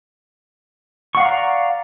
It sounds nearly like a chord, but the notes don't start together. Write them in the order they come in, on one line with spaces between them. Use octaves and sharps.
C#6 F#5 F5 D5 A#5